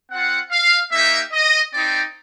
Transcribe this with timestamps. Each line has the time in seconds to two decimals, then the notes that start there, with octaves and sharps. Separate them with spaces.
0.10 C4 F4 F#5
0.51 F5
0.92 A#3 D#4 G4 E5
1.32 D#5
1.74 C4 D#4 G4 D5